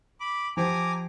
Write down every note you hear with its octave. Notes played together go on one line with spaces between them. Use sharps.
B5 D6
F3 G4 C5 G#5 A#5 D6